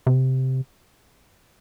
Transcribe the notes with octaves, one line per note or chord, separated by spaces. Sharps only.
C3